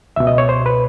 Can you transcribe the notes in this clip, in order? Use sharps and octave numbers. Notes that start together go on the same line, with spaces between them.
C#2 B2 E5
D#5
C#5
C5
B4